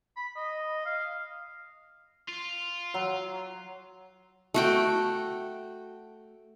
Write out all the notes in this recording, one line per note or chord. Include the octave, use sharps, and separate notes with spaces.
B5
D#5
F5
F4
F#3
A3 F#4 G5